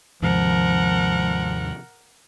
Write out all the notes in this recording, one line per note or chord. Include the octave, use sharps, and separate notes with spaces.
D#2 G#2 C3 F3 A#4 F#5